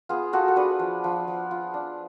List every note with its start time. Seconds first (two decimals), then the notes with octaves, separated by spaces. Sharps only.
0.09 B3 F4 G#4
0.33 F4 F#4 A4
0.48 A4
0.56 D4 G#4 B4
0.79 F3
1.04 F3
1.28 F3
1.51 F4
1.74 D4